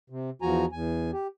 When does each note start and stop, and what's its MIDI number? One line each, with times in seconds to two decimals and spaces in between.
0.10 0.30 48
0.42 0.65 40
0.42 0.65 53
0.42 0.65 66
0.42 0.65 80
0.42 0.65 82
0.72 1.11 40
0.72 1.11 80
1.13 1.27 67